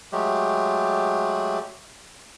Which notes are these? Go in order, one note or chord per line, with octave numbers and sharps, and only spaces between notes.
F#3 G#3 A3 G4